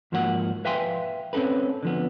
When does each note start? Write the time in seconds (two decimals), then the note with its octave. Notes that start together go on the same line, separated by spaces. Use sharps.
0.12 G#2 F3 A#3 F#4 A#4 F#5
0.65 B4 E5 F5 G5 G#5 C6
1.33 C4 C#4 F4 A4 B4
1.83 D3 F3 B3